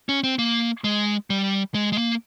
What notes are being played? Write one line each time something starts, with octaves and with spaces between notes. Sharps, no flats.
C#4
C4
A#3
G#3
G3
G#3
G#3
A#3